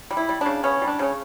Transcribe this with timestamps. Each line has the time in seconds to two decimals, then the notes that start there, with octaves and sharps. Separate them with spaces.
0.11 G3
0.17 E4
0.29 G3
0.41 C#3 D4
0.64 B3 C#4
0.82 G3
0.87 D4
0.99 C#3 C#4